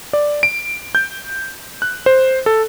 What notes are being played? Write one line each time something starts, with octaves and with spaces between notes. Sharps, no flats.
D5
D7
G6
F#6
C5
A4